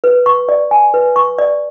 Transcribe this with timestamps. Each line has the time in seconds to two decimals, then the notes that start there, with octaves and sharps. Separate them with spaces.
0.04 B4
0.26 C#6
0.49 D5
0.71 G#5
0.94 B4
1.16 C#6
1.38 D5